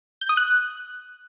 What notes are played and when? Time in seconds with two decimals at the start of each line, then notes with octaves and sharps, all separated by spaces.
0.21 G6
0.29 D#6
0.37 F#6